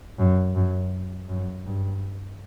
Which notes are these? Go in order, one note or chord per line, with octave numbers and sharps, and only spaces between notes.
F#2
F#2
F#2
G2